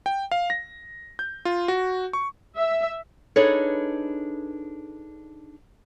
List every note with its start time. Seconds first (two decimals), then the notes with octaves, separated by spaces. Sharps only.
0.06 G5
0.31 F5
0.50 A#6
1.19 G6
1.45 F4
1.68 F#4
2.13 C#6
2.56 E5
3.36 D4 D#4 G#4 A4 B4 C#5